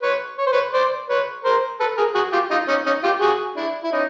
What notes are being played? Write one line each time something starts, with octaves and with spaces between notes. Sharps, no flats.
B4 C#5
C#5
C5
B4 C#5
C5 D5
B4 C#5
A#4 C5
A4 B4
G#4 A#4
F#4 G#4
F4 G4
D#4 F4
C#4 D#4
C#4 D#4
F4 G4
F#4 G#4
D4 E4
E4
C#4 D#4